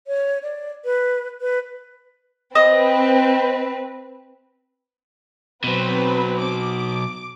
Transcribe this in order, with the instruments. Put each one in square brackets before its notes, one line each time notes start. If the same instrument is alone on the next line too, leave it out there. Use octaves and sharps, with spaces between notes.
[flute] C#5
D5
B4
B4
[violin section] C4 B4 [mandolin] D#5 E6
[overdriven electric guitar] B2 F#3 [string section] C4 B4
[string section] D6